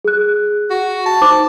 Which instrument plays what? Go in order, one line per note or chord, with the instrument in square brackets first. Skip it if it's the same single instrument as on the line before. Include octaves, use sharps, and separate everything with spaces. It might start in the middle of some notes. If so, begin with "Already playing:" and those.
[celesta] G#4 F#6
[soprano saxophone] F#4
A5
[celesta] D#4 C5 D6